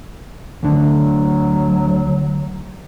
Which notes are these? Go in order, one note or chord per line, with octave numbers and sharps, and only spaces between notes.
D2 D3 F#3